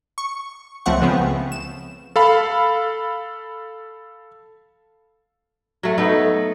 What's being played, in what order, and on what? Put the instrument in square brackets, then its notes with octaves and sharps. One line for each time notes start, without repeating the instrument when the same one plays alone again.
[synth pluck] C#6
C#2 F3 A3 C4 F#5 C#6
C#3 F3 B3 C4
E7
[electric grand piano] A4 F5 B5
[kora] F#3 A3
A3 B3 D#4 A4